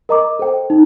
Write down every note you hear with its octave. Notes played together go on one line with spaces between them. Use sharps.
A#4 D#5 A#5 D6
A4 C5 G5
D#4